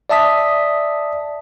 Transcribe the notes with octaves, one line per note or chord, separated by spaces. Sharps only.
D5 E5 A5 D#6 B6